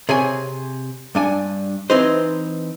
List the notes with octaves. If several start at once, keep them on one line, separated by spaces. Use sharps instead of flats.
C3 G#4 C#5 G#5
G2 D4 G#5
E3 C4 D#4 B4 C5